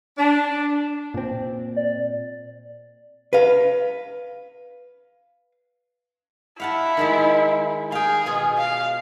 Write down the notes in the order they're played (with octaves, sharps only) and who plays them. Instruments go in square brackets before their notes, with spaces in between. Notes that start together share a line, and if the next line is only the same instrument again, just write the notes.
[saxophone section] D4
[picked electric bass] A#2 C4
[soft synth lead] D5
[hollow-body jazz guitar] B4 F5
[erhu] E4 [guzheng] F5 F#5 A5
[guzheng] D#3 G#3 G#4
[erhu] G#4 [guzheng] F5 G5
[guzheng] B2 F4
[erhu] F5